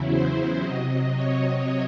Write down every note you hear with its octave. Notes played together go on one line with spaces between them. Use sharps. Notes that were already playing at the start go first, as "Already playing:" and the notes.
Already playing: E2 C#3 F#3 E4
C5
C3 F#3 D#5
C#5